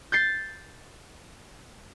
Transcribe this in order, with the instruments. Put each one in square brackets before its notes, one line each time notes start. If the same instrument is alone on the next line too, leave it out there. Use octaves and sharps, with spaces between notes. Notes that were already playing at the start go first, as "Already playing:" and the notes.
[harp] G6 A6 C7